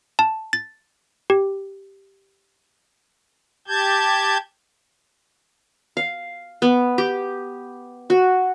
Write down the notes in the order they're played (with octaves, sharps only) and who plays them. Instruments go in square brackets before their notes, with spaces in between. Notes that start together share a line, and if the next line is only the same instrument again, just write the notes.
[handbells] A5
A6
G4
[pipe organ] G4 A5 G6 G#6
[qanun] F5
B3
G4
F#4